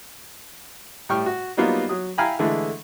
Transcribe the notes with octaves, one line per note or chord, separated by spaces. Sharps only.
A2 G3 G5 C#6 F6
F#4
F#3 G3 A#3 B3 D#4 F4
F#3 D#6
E4 F5 G5 G#5 A#5 B5
D3 E3 G#3 A3 E4